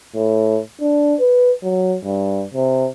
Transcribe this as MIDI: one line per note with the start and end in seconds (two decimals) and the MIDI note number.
0.15 0.60 45
0.81 1.14 62
1.19 1.51 71
1.63 1.96 54
2.04 2.43 43
2.54 2.88 48